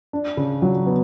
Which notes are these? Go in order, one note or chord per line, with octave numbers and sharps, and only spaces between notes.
D4
C#3
F#3
B3